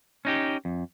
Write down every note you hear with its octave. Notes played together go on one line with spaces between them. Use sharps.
C#4 D#4 G4
F2